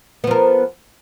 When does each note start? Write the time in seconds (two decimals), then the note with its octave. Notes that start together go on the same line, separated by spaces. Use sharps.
0.24 B3
0.27 F3
0.31 A#4